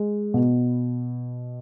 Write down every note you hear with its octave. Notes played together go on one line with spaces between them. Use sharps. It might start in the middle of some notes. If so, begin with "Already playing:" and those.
Already playing: G#3
B2